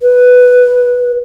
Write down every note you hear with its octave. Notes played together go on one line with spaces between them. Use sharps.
B4